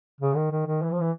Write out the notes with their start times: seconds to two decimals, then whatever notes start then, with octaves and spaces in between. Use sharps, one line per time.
0.21 C#3
0.36 D#3
0.51 D#3
0.66 D#3
0.82 E3
0.91 F3
1.01 E3